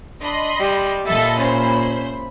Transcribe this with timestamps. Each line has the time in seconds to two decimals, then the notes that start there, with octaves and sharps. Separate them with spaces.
0.22 D4 D#5 B5 C6
0.59 G3
1.07 A#2 A4 D#5 E5 B5 A6
1.39 C#4 C5